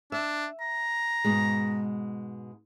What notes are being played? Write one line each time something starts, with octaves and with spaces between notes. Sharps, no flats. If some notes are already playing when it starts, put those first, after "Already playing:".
D4 E5
A#5
G#2 B2 G#3